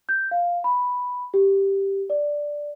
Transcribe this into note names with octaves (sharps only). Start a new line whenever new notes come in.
G6
F5
B5
G4
D5